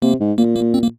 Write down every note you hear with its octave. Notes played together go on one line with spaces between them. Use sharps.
C3 A#3
G#2
A#2 A#3
A#3
C4
A#3